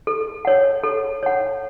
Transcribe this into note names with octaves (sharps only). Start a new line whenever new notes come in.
A4
C#5 F#5
A4
C#5 F#5